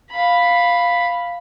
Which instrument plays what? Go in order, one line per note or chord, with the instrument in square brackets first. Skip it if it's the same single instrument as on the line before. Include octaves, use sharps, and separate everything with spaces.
[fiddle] F5 B5